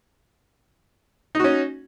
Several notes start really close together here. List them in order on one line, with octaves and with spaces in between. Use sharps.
D#4 F#4 C#4